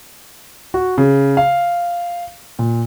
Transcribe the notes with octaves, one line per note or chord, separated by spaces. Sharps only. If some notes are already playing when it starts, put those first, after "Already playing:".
F#4
C#3
F5
A#2